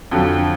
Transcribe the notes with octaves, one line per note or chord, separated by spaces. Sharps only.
F2 D3 F#3